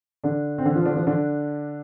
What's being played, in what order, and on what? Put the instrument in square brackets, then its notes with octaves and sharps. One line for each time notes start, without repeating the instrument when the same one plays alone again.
[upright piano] D3 D4
C4
D3 D4
F3 F4
D3 D4
F3 F4
D3 D4